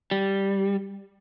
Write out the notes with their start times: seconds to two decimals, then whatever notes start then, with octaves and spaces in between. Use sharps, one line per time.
0.11 G3